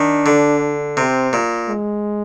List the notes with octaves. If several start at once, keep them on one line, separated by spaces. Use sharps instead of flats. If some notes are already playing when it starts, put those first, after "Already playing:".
Already playing: D#3 D4
D3
C3 C4
A#2
G#3